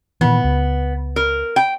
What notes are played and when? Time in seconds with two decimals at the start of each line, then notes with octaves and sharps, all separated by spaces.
0.21 A#2 D#3 E3 B3
0.44 C#2
1.16 A#4
1.56 G5